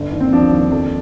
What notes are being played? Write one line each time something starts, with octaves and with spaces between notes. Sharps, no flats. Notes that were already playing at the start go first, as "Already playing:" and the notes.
Already playing: G1 D3
D#2
C4
F3 D4
D#2
F2